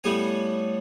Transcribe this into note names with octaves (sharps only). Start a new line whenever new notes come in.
A2 G3 B3 G#5